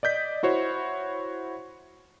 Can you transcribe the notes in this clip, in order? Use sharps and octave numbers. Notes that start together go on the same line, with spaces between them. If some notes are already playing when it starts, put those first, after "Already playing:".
D5 D#5 G6 B6
E4 F#4 C5 C#5